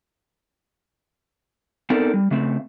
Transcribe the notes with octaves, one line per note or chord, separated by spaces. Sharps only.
B3 C4 D#4 A4 A#4 D5
G3
C#3 A3 C4